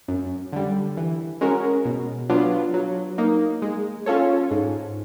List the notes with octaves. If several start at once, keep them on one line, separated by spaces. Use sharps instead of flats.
F#2
D3 G3
E3
G#3 C#4 F#4 A#4
B2
F#3 B3 D4 F4
F#3
A#3 D#4
G#3
C#4 F4 A4 C#5
G#2